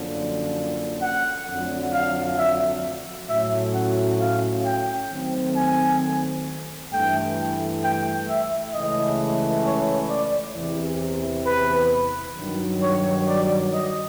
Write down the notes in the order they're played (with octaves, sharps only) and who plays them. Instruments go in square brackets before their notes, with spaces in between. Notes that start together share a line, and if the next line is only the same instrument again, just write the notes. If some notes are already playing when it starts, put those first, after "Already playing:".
Already playing: [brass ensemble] F#2 D3 F3 A#3 C#4
[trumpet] F#5
[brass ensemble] F2 D3 F#3 A3
[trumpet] F5
E5
[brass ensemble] A2 F#3 A3 C#4 F#4 [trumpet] E5
[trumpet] F#5
F5
G5
[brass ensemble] D#3 F#3 A3 C4
[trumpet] G#5
[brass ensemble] G2 E3 A3 [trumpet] G5
[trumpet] G5
E5
[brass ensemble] C#2 C#3 E3 A3 C#4 [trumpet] D#5
[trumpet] C#5
D5
[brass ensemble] E2 C3 E3
[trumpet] B4
[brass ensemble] G2 D#3 F#3
[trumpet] C#5
D5
D#5